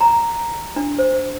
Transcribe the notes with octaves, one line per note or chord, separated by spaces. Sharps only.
A#5
D4
C5